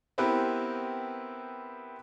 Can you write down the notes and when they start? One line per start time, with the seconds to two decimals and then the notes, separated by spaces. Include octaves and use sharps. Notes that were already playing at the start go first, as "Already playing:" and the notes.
0.18 B3 C4 E4 G4 A#4 B4